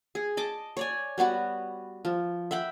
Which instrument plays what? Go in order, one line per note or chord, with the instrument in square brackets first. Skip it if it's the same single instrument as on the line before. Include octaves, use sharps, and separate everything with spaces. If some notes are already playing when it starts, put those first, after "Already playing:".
[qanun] G#4
D#5 A5 D6
C#5 D5 G#5
G3 B3 F#4 F#5
F3
E5 F#5 G5 B5